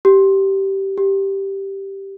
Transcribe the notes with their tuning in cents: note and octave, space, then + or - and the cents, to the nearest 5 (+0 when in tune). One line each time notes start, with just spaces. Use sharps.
G4 -15
G4 -5